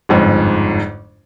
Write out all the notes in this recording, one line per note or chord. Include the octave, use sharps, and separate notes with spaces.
G1 F2 G#2